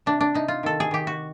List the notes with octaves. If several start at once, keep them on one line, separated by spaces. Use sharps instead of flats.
C3 D4
D4
C3 D#4
F4
D#3 A4
G#4
D#3 G4
F#4